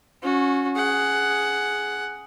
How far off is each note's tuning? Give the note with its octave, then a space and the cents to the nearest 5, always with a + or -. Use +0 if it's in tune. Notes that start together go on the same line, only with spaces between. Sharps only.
C#4 +0 F#4 -20
G#4 +5 F#5 +10